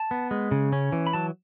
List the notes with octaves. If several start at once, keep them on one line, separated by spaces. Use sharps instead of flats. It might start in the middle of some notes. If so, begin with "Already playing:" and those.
Already playing: A5
B3
G#3
C#3
C#4
E3
B5
F#3 A5